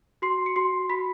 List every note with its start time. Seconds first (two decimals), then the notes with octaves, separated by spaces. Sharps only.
0.22 F#4 C6 C7
0.46 C#7
0.56 F#4 C6 C7
0.89 F#4 B5 B6